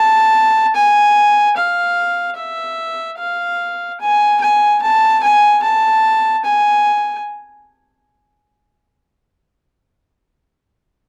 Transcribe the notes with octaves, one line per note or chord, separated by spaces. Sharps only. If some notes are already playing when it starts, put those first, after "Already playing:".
Already playing: A5
G#5
F5
E5
F5
G#5
G#5
A5
G#5
A5
G#5